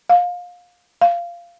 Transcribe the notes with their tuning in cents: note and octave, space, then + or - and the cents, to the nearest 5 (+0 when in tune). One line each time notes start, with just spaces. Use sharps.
F5 +25
F5 -15